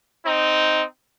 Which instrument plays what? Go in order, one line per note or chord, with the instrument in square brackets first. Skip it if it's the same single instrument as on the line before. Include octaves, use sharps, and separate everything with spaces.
[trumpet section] C4 D#4